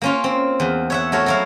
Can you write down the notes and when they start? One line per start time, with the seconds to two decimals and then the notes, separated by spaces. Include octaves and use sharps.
0.02 A#3 C#4 F4
0.24 C4
0.60 E2
0.90 C#5 E5 F#5
1.12 A3 F#4 A#4 C#5
1.26 F#3 E4 F5